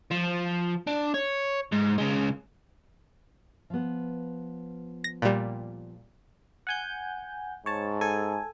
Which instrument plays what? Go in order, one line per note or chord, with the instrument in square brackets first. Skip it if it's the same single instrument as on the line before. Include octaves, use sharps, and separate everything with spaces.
[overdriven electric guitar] F3
D4
C#5
G#2
C#3 G#3
[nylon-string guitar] F3 B3
[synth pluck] A#6
A#2 G3
[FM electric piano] F#5 G#5 G6
[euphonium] G#2 [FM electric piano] C#5 A5
[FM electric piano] A4 G#5